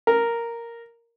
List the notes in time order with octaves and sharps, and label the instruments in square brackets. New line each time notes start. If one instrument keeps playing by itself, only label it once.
[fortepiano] A#4